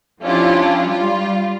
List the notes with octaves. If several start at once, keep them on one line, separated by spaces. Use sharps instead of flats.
F3 C#4 D4 E4 F4 G4
G3 F4